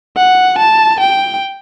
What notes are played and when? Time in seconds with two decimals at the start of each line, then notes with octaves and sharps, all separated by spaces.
0.17 F#5
0.58 A5
1.00 G5